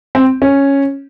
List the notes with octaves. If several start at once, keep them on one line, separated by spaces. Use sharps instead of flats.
C4
C#4